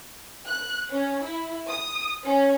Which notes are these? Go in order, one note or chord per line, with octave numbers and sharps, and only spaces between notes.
F#6
C#4
E4
D#6
C#4